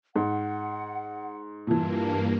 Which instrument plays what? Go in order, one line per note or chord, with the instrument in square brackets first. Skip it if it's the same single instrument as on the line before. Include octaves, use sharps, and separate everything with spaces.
[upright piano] G#2 [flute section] F#5
[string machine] G2 A#3 [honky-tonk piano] A#2 E3 [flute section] A5